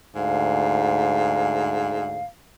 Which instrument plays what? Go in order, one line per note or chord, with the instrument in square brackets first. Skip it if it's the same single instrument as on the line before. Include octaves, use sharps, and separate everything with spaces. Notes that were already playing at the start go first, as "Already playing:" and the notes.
[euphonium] D2 [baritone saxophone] G#2 [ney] F5